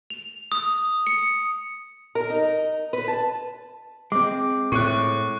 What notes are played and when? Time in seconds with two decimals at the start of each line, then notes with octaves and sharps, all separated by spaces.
0.10 F7
0.52 D#6
1.07 C#7
2.15 A#4
2.30 D#4
2.93 B4
3.08 A5
4.12 G#3 C4 D6
4.72 A2 C#6 F#6